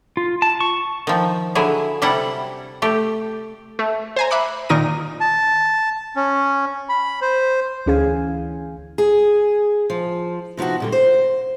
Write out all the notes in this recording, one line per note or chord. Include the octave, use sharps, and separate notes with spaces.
F4
A5
C#6
D#3 F3
D3 F#3 E4 G#4
C3 G3 E4 A4 F#5
A3 G4
A3
C5 G#5 A#5
E5 B5 D6 F#6 C#7
A#2 D#3 D#4 A#4 A#6 D#7
A5
C#4
B5
C5
D2 E3 C#4 G#4 F5 G#5
G#4
F3
C3 F3 B3 D#4 F#4
A#2 D3 G3
C5